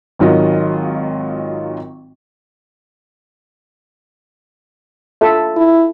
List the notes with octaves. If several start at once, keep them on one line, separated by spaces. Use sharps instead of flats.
G#1 D#3 F#3 F4 D#5
F4 A4 E5
E4